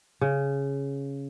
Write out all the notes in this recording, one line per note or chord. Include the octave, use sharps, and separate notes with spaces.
C#3